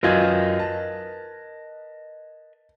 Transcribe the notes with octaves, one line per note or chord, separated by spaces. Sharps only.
F#2 F4 A#4 B4 D#5 G#6
A5